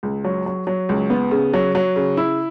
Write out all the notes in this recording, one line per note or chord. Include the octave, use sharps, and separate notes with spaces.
C#2
F#3
F#3
F#3
C#2
B3
C#3
F#3
F#3
C#3
E4